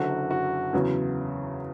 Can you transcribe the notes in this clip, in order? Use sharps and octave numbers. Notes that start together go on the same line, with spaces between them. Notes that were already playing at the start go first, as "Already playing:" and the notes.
Already playing: F#1 F#2 D3 F#4
F#4
E2 C#3 F#3